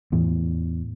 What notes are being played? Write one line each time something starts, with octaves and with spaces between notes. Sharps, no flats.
E2 A2 E3 B3